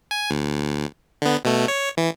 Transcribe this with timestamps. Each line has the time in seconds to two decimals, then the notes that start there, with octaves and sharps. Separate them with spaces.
0.11 G#5
0.31 D2
1.22 D3 B3
1.45 B2 A3
1.68 C#5
1.97 E3